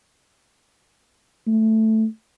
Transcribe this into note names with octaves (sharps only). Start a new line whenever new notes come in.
A3